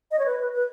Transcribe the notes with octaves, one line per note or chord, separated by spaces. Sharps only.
D#5
C#5
B4
B4
B4